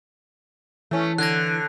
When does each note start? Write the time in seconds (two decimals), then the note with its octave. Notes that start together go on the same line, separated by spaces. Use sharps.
0.91 E3 A3 C#4
1.18 D3 F#6 G#6 A#6